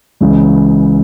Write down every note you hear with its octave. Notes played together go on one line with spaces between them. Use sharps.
C#2 C#3 E3